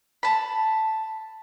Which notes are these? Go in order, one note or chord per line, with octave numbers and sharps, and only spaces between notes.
A5 B5